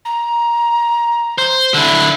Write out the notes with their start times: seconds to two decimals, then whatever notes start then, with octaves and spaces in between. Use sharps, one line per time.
0.05 A#5
1.38 C5
1.74 D3 E4